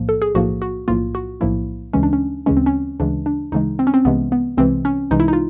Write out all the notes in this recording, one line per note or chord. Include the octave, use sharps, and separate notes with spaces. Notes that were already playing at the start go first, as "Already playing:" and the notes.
Already playing: B1 A2 F3 A#3
A4
G#4
B1 A2 F3 A#3 F#4
F#4
B1 A2 F3 A#3 F4
F#4
B1 A2 F3 A#3 E4
D2 C#3 E3 G#3 C#4
D4
C#4
D2 C#3 E3 G#3 C#4
C4
C#4
D2 C#3 E3 G#3 D4
D4
D2 C#3 E3 G#3 D#4
C4
C#4
C4
C2 C3 E3 G#3 B3
B3
C2 C3 E3 G#3 C4
C#4
C2 C3 E3 G#3 D#4
E4
D#4
F4